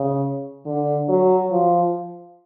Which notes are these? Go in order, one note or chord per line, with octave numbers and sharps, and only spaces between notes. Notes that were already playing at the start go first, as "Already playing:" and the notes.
Already playing: C#3
D3
F#3
F3